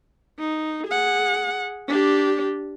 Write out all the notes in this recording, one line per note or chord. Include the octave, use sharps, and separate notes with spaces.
D#4
G#4 F#5
D4 G4